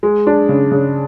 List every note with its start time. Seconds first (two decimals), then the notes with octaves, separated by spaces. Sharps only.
0.03 G#3
0.27 D4
0.49 C#3
0.71 C#3